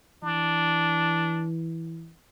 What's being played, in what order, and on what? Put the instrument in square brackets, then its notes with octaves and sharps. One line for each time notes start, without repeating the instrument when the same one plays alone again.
[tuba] E3 [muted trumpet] D4